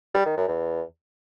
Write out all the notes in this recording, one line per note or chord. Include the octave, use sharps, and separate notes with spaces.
G3
D#3
F#2
E2